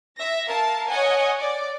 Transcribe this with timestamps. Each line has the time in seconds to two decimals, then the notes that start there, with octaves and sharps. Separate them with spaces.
0.17 E5 A#6
0.47 A#4 F5 A5
0.88 C#5 D#5 F#5 G#5
1.40 D5